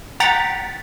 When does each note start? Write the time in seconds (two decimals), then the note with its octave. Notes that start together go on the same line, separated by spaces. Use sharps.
0.20 F#5 G5 A#5 A6 B6